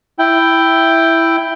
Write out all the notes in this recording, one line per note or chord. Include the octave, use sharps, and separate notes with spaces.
E4 G5